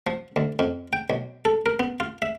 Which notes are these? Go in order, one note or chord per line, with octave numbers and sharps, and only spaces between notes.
F3
D2
F2
G5
B1
A4
A#4
B3
F4
E5